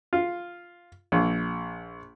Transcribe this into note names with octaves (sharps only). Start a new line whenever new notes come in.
F4
A#1